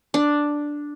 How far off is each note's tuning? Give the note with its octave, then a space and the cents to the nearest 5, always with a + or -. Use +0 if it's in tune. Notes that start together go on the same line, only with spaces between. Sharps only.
D4 +0